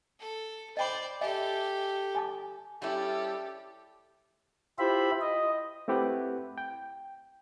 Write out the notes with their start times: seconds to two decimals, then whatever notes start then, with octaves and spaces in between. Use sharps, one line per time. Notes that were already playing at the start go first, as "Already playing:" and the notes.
0.19 A4
0.77 C5 D5 D#5 G5 B5
1.21 G4 A4 D#5 E5 G#5
2.15 G#5 A5 D6
2.82 G3 C#4 E4 G4 A4
4.79 E4 F4 G4 C5 E5 B5
5.21 D#5
5.88 A3 C4 E4 G4 B4 F#5
6.58 G5